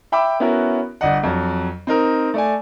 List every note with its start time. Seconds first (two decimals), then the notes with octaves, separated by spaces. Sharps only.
0.12 E5 G5 B5 D6 E6
0.40 B3 C#4 E4 F#4 A#4
1.01 G1 D5 D#5 F#5
1.23 F2 F#3
1.87 C4 D#4 A#4
2.34 A3 D5 G#5